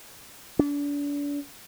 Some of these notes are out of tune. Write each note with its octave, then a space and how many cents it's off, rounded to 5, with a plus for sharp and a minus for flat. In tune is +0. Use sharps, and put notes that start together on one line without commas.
D4 -35